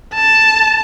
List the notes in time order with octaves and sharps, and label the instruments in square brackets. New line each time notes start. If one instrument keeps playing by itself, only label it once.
[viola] A5